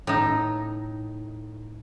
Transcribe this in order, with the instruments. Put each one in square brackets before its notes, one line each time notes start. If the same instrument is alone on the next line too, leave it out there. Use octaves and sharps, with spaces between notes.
[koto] A2 D#4